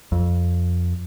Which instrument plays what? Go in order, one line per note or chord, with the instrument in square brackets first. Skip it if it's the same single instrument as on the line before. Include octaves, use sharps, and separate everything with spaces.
[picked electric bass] F2